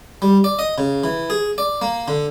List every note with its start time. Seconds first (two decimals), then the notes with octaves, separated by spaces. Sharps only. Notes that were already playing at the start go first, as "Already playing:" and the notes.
0.22 G3
0.44 D5
0.59 D#5
0.78 C#3
1.04 E3
1.30 G#4
1.58 D5
1.82 A#3
2.08 D3